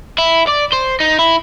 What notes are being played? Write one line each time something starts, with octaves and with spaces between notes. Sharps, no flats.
E4
D5
C5
D#4
E4